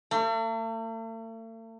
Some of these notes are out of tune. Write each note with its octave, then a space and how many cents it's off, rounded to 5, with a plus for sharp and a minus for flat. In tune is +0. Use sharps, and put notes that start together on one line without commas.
A3 +45